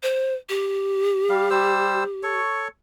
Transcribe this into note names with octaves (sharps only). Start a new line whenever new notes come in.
C5
G4
G3 F5
G3 C5 E6
A4 C#5 C#6